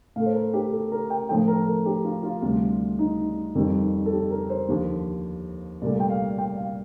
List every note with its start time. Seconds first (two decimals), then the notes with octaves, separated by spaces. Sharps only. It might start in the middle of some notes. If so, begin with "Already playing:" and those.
0.16 A2 A3 F5
0.26 C5
0.35 A#4
0.54 G4
0.72 A4
0.92 A#4
1.10 G5
1.29 A2 F3 A3 G5
1.48 A#4
1.67 A4
1.86 G4
2.05 F4
2.23 F4
2.42 D2 C3 G3
2.99 D#4
3.55 F2 D#3 G3
4.06 A4
4.12 G4
4.31 A#4
4.50 C5
4.68 D#2 D3 F3
5.82 C2 A#2 A3 D5
6.00 G5
6.10 F5
6.38 G5
6.57 F5